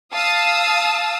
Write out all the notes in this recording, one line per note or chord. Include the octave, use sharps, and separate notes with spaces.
F5 A5 D#6 E6